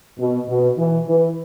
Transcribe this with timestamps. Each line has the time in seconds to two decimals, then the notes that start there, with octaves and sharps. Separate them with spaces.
0.19 B2
0.48 B2
0.78 E3
1.08 E3